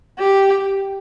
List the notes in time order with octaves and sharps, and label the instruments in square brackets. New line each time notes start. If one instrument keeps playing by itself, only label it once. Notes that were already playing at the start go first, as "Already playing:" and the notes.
[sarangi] G4